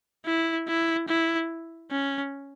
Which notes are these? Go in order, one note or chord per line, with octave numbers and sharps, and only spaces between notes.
E4
E4
E4
C#4